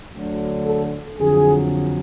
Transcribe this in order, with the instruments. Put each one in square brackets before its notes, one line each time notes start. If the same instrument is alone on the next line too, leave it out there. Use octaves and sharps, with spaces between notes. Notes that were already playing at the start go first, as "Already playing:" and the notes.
[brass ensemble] D2 D3 F#3
A4
F2 D3 F#3 G#4